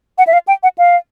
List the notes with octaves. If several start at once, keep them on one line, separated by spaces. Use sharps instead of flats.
F#5
E5
F5
G5
F#5
F5